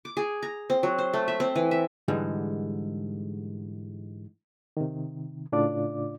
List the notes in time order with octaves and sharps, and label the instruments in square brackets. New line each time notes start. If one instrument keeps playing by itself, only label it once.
[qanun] D6
G#4
A#5
C4
F#3
C5
A3
E5
C4
E3
E5
[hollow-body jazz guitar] G#2 D3 E3 G3 G#3
[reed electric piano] C3 D#3
A2 C#3 D4 F4 D5 D6